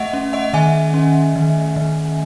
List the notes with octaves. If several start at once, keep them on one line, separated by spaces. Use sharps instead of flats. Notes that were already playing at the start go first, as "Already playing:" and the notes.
Already playing: A3 D#5 E5 F#5
C#4
D#5 F#5
D#3 E5 G#5
C#4
D#3
D#3